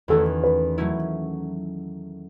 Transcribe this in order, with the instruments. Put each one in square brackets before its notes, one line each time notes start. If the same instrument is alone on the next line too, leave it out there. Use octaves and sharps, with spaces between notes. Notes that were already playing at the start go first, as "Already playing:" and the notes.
[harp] E2 D#3 A3 C#4 F#4 [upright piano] A4
[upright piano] B4
[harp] F#3 A3 C#4 E4